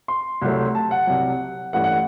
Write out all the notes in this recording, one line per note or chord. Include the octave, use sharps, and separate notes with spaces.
C6
C2 C3 F#3 A3
A5
F#5
C2 C3 F#3
A1 G2 E3 A3 F#5
F#5